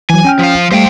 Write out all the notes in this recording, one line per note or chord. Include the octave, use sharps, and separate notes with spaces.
E3 F#3 G#5
C#4 G5 F6
F3 F5
G3 A3 C5 F5 G5